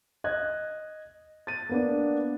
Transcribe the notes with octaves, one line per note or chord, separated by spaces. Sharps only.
D#5 F#6 G#6
A6 D#7
A#3 B3 D4